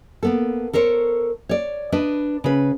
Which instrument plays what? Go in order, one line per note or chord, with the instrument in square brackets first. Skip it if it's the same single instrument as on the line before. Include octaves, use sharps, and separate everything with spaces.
[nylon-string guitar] A#3 B3 A4
A4 A#4 C5 C#5
C#5 D5
D4 B4 D#5
C#3 B4